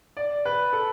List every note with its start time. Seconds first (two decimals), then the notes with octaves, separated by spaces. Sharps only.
0.17 D5
0.45 B4
0.73 A4